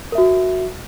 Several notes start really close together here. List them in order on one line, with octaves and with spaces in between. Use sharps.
A#4 E5 F#4